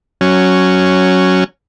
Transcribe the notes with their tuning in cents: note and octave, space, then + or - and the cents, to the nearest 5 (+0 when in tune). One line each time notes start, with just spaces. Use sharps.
F#3 +0 C#4 +0